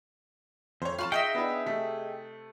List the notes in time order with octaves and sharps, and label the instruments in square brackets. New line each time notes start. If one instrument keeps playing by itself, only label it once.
[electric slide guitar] F2 [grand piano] C5 C#5
[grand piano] F4 F5 C#6 [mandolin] A5 B5 F6
[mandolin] D#4 D#5 E5 [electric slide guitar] G#4 G5
[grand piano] B3 D4 E4
C3 A3 B6